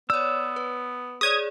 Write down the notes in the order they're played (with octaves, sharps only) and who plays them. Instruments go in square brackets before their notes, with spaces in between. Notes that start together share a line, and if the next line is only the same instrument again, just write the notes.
[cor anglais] B3 [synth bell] C#5 D5 [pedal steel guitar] E6
[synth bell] B4
[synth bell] G#4 C#5 D5 [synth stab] D#6 G#6